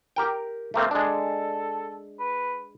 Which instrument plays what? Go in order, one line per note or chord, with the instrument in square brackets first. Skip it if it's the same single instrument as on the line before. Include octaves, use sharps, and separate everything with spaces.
[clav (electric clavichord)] G4 A#4 G5
A3 A#3 C4
[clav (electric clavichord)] G#3 D4 [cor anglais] A4
[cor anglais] B4